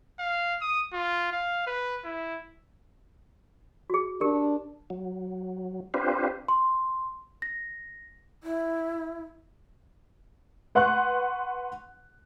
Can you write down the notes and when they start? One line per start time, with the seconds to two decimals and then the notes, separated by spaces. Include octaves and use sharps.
0.19 F5
0.61 D#6
0.93 F4
1.32 F5
1.67 B4
2.05 E4
3.90 F#4 G#4
4.21 D4 G4 A#4
4.90 F#3
5.94 C4 D4 F4 G4 B4 C5
6.48 C6
7.42 A#6
8.43 E4
10.75 B4 F#5 C6 C#6 F#6